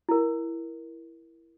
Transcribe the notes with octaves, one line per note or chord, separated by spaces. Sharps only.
E4 A#4